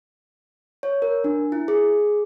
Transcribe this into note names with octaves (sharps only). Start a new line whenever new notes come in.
C#5
A#4
D4
E4
G#4